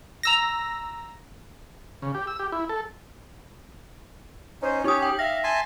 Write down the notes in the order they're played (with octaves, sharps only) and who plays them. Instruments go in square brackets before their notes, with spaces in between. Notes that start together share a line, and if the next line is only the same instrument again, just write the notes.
[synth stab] A#5 E6 A#6
[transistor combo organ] C#3
G4
E6
G4
E4
A4
[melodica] C#4 D#4 [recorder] C5
[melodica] C#4 C#5 [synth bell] D#4 D#6 [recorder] G4
[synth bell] G5
[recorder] E5 [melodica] F5 [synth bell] A#6
[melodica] G#5 A5 C6